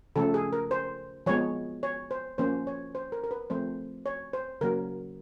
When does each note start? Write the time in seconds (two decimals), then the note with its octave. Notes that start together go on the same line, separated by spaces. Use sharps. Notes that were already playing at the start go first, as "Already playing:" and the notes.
0.16 C#3 F3 A3 A4
0.34 G#4
0.53 A#4
0.71 C5
1.26 F3 G#3 B3 C#5
1.83 C#5
2.11 C5
2.38 F3 A#3 C#4 C5
2.67 C#5
2.95 C5
3.12 A#4
3.24 A#4
3.31 B4
3.50 F3 A3 C4 C5
4.06 C#5
4.33 C5
4.61 C#3 F#3 A#3 A#4